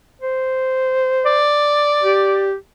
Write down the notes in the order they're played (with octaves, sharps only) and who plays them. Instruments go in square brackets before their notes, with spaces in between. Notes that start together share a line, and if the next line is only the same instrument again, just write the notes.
[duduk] C5
[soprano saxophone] D5
[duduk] G4